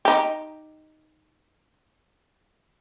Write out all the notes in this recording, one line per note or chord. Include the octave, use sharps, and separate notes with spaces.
D#4 G4